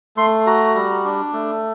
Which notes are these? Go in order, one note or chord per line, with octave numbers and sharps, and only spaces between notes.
A3 C6
F#4 A#5
G3
D4
A3